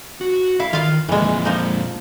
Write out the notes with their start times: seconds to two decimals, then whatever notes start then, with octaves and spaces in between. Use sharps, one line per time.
0.21 F#4
0.60 E4 F5
0.73 D#3 F4 F5
1.09 F2 A#2 E3 G#3
1.45 F3 D#4